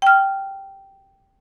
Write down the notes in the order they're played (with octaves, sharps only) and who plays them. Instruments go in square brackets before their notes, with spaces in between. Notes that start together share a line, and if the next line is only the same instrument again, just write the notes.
[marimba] G5 F6